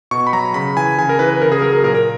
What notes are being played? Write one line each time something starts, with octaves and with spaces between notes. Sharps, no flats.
B2 C#6
B5
F#3 A#5
C#3 B5
E3 G#5
C#3 G#5
A#4
E3 B4
B4
C#3 A#4
G#4
F#3 A#4
A#4
A#2 A#4
A#4